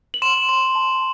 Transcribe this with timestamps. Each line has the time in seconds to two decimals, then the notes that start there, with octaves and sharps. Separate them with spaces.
0.14 F#7
0.22 C6 E7
0.49 C6
0.75 A5